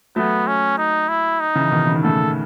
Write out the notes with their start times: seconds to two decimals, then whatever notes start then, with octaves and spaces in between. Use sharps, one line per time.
0.16 F#3 A3 B3
0.47 C#4
0.78 D#4
1.09 E4
1.40 D#4
1.55 C#3 E3
1.71 B2 D#3
1.87 C#3
1.95 D#3
2.03 A2 C#3 A4